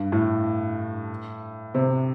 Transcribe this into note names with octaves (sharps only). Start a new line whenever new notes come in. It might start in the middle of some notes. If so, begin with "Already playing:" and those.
Already playing: G2
A2
C3